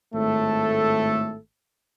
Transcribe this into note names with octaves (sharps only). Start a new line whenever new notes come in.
G#1 A2 A3 A4